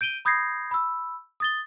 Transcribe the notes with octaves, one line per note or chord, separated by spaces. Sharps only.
G6 D7 D#7 G7
B5 D#6 G6 G#6 A#6 C7
B5 E6
D#6 A6 G7